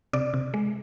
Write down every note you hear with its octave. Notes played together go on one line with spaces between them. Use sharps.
C3 D5
C3
G#3